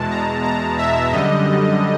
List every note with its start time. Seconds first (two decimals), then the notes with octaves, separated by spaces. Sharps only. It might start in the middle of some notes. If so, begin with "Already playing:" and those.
Already playing: E2 B2 G#3 A5
0.11 A#5
0.44 A#5
0.78 E5
1.12 F#2 D3 G3 D#5